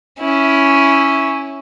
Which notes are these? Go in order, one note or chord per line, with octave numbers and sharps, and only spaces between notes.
C#4 E4